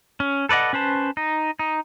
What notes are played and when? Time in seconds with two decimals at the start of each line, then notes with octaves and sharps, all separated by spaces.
0.20 C#4
0.49 A4 B4 D5 D#5 F#5
0.73 C#4 B4 C5 A5
1.17 D#4
1.59 D#4